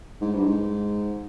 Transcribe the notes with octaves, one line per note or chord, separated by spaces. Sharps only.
G#2
G2
G#2